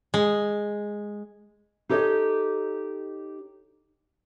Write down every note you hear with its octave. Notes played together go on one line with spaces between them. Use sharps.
G#3
D#4 G4 A4 C#5 D#5